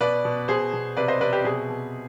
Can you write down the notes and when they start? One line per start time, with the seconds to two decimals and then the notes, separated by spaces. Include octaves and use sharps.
0.01 B2 B4 D5
0.25 B2
0.48 B2 G#4 C5
0.73 B2
0.97 C3 B4 D5
1.08 C5 D#5
1.21 C3 B4 D5
1.33 G4 B4
1.44 B2 G#4
1.70 B2